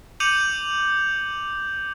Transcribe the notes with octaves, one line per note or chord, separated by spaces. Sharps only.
D6 G6 C#7 D#7 F7 F#7